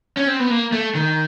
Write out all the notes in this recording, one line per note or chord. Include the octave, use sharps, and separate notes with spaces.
C#4
C4
B3
A#3
A3
D#3